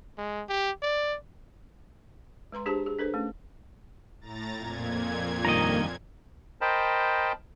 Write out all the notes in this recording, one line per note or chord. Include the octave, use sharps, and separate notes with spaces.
G#3
G4
D5
G#3 B4 A#5 C6
D4 G4 G#4 C5 A5
G#4
D4 A4 B4 C5
A3 C#4
A2 A#5 A6
F2 A#2 G#6
G2 D#3 A#3 D#5 A#5
A#4 C5 D#5 G5 A5 B5